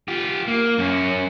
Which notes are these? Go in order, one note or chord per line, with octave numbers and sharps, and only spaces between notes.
F4 G4
A#3
F#2 C#4